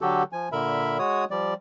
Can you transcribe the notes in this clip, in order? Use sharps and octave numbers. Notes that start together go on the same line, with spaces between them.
D3 F#3 F#4 G4 A4
F3 G#5
A#2 D3 A#4 E5 B5
G#3 F#4 C#5 D#6
F3 G3 D5